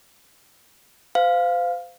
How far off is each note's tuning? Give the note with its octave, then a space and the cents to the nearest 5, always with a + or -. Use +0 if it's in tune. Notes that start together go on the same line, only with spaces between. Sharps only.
C5 -40 F5 +0